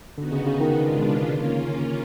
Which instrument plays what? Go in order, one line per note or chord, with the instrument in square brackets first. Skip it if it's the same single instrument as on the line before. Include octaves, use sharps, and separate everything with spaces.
[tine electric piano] D3 [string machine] B3 D#4 F#4
[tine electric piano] C#3
C#3
D#3
[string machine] B2 G#3 B3 D4 F4
A#3 C#4 F4